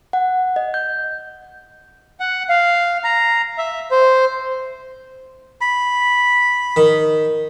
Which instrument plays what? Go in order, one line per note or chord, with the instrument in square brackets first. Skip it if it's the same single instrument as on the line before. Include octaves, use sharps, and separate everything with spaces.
[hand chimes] F#5
D#5
G6
[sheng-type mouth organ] F#5
F5
A#5
E5
C5
[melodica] B5
[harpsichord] D#3